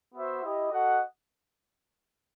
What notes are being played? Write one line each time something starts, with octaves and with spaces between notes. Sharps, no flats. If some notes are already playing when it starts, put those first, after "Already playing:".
B3 F#4 C5 E5
E4 G4 D#5
F#4 A4 D#5 F#5